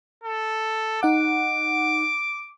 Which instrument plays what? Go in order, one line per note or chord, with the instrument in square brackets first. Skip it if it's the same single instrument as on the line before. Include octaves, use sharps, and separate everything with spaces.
[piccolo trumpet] A4
[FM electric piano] D#4 F#5 [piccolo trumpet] D6